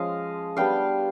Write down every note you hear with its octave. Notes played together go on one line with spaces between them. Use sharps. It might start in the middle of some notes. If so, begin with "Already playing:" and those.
Already playing: F3 G#3 C#4 D#5 F5
G3 B3 D4 F5 G5